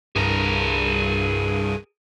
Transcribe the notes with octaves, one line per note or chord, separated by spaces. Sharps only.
C2 G2 G#4 A#4